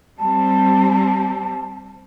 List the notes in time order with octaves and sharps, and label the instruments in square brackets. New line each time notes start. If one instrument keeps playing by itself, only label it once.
[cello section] G3 C4 [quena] A5